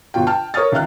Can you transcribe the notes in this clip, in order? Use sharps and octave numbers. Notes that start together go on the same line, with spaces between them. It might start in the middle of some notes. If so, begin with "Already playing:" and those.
G1 B2 F4 G5
G5 A5 F6
A#4 C#5 C#6 D#6 F6 A6
C#2 D#3 E5 F6 F#6